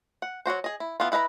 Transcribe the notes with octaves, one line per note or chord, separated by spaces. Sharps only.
F#5
F#3 G#3 F#4 C5
G#4 D#5
E4
E3 B3 E4 F4
E4 B4 D#5 E5 A#5